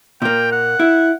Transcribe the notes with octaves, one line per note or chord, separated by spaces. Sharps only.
A#2 A#3 G5
F#5
E4